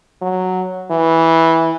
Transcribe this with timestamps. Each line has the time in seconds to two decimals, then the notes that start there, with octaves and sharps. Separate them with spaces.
0.22 F#3
0.90 E3